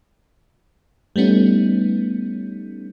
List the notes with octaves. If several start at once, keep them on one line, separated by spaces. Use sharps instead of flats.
G3 A3 B3 C#4 D#4